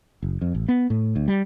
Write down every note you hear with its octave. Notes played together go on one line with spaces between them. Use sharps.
F#1
F2
A1
B3
A2
D2
G3